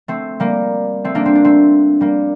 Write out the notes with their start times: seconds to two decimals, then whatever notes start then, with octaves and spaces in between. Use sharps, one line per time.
0.08 A3 C4
0.40 G3 A#3
1.05 A3 C4
1.15 A#3 D4
1.26 C4
1.35 D4
1.45 A3 C4
2.01 G3 A#3